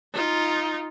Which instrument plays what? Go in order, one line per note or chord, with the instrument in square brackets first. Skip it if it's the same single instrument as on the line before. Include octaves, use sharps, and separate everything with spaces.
[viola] D#4 F4